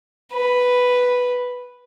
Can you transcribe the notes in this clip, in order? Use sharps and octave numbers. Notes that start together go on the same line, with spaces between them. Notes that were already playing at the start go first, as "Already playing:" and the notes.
B4